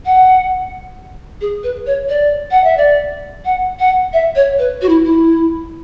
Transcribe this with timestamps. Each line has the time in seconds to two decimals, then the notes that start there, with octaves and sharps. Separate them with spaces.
0.05 F#5
1.41 G#4
1.63 B4
1.86 C#5
2.09 D5
2.51 F#5
2.64 E5
2.77 D5
3.45 F#5
3.79 F#5
4.13 E5
4.35 C#5
4.59 B4
4.81 F#4
4.89 E4
5.04 E4